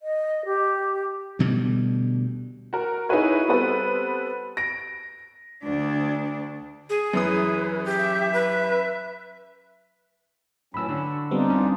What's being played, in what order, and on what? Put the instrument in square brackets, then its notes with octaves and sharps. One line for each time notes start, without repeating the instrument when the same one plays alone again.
[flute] D#5
G4
[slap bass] D2 B2 G3
[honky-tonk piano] F#4 A#4
D#4 E4 F#4 G#4 B4 C#5
G3 B3 C4 A4 B4
A#6 D7
[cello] D2 D4
[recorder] G#4
[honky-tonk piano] F#2 E3 D#6 [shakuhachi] B4
[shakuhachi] G4
[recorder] E5
[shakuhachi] B4
[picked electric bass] G#1 A2 [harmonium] E3 F#3 C#4 [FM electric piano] B5 E6
[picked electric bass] D3 [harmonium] C#5
[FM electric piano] G3 B3 C4 [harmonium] D4 D#4 F4
[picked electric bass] F1 C#4